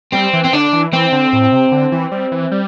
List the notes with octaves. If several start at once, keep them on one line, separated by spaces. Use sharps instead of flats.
G3 C4
E3
C4
D3 D4
E3
E3 C4
D3
A2
C3
D3
E3
G3
E3
G3